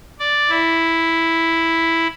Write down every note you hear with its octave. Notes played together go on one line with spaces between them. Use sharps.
D5
E4